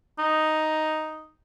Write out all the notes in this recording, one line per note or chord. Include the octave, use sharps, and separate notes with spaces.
D#4